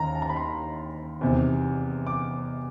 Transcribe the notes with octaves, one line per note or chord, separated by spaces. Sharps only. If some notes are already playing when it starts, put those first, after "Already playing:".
Already playing: D#2 D#3 A#5
A5
A#5
B5
C6
E2 C3 D#3
D6